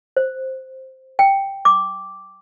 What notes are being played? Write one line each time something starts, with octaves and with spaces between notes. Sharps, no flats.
C5
G5
D6